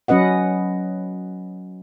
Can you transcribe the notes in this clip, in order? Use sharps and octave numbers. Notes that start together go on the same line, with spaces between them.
F#3 C#4 B4 D#5 F#5